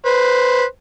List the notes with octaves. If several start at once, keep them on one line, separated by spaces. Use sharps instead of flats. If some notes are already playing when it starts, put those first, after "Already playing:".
B4 C5